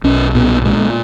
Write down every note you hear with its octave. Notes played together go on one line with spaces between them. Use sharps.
B1 C#4
A#2 B3
A#2 G#3